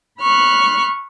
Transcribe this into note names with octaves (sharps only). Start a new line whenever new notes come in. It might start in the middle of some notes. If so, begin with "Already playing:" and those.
B5 C#6 F6 F#6